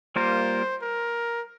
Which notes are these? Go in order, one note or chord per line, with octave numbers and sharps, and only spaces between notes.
G3 A#3 F4 A#4 C5
A#4